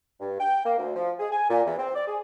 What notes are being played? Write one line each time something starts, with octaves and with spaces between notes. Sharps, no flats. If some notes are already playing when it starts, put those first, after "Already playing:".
G2
G5
A#3
D2
F3
G#4
G#5
A#2
E2
C4
D5
G#4